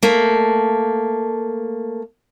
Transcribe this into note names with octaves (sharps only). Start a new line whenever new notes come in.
A3 A#3